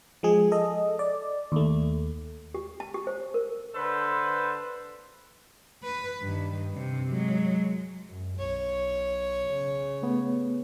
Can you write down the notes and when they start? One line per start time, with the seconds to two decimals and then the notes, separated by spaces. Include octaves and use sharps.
0.23 F3 G#3 G#4
0.52 A4 D#5
0.99 D5
1.52 D#2 A3
2.54 G4
2.80 A5
2.94 G4
3.07 C5
3.34 A#4
3.75 D3 A4 B4 C5
5.83 B4
6.21 G2 D#3
6.74 G2 C3
7.09 F#3 G#3
8.08 F#2
8.39 B1 C#5
9.48 C#3
10.02 A3 B3